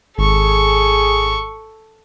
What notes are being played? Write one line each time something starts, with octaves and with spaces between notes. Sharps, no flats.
G#1 G#4 A4 C#6